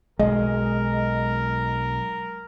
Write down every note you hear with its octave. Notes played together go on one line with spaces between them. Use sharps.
B1 G#3 A#4 D#5